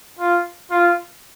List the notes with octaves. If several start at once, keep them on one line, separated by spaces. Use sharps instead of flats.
F4
F4